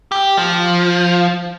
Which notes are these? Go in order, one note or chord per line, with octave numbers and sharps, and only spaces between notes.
G4
F3